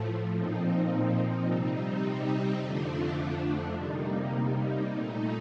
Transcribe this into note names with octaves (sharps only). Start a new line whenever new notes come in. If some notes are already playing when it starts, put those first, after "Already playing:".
Already playing: A2 F3 A3
A#2 F3 C4 D#4
C3 G3 C4 D#4
F2 D3 F3 A3 D4
C3 G3 A#3 D#4
A#2 A3 D#4